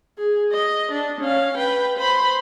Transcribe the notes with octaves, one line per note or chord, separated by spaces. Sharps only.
G#4
D#5
D4
C#4 F5
B4 G5
C5 B5